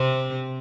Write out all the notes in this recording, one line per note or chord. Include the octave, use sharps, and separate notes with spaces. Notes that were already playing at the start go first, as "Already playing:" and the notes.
Already playing: C3 C4